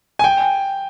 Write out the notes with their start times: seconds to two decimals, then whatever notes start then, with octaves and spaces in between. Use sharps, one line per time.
0.19 G#5
0.24 G5